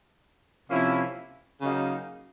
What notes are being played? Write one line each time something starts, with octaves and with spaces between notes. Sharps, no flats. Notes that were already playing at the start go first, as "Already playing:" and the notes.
C3 F3 A#3 C#4 E4
C#3 F#3 A#3 D#4